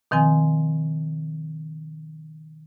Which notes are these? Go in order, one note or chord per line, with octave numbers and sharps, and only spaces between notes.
B2 D#3 F3 C4 G#5